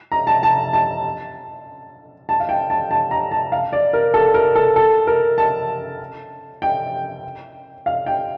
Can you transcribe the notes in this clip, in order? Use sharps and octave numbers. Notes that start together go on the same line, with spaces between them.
A#5
A5
A5
A5
A5
F5
G5
A5
A5
A#5
A5
F5
D5
A#4
A4
A#4
A4
A4
A#4
A5
G5
F5
G5